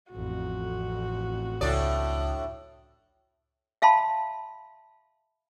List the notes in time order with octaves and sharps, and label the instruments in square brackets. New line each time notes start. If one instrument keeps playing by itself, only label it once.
[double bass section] A1 F2 [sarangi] F#4
[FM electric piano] C#2 D#6 [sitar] A2 D4 D5
[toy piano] E5 F5 A5 B5 C6